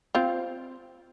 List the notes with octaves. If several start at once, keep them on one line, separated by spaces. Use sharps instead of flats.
C4 F4